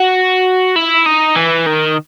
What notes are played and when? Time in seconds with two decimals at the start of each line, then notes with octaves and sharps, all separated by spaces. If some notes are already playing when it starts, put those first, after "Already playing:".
Already playing: F#4
0.76 E4
1.06 D#4
1.36 E3
1.66 D#3